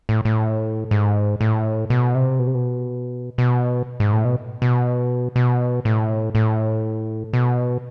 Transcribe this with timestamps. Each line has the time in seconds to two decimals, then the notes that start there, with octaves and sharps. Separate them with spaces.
0.09 A2
0.25 A2
0.91 G#2
1.41 A2
1.90 B2
2.15 C3
2.39 B2
2.47 C3
2.55 B2
3.38 B2
4.00 G#2
4.13 A2
4.25 B2
4.62 B2
5.36 B2
5.85 A2
6.35 A2
7.33 B2